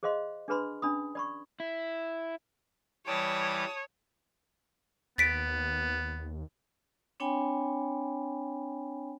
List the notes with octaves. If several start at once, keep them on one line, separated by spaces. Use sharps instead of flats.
G#4 C5 D#5 F5 C6
D4 G#4 B4 B5 C6
C#4 D4 B5 D#6
D5 B5 C#6
E4
E3 G3 C#5 A5 D6 D#6
D#2 B3 A6 B6 D7
C4 D4 C#5 G5 G#5 B5